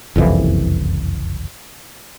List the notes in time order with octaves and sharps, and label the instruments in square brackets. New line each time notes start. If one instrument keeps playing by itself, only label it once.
[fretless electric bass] F#1 C2 F2 E3